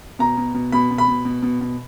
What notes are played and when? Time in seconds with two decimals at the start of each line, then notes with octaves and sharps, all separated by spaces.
0.19 B2 A#5
0.37 B2
0.54 B2
0.72 B2 B5
0.91 B2
0.98 B5
1.08 B2
1.25 B2
1.42 B2
1.61 B2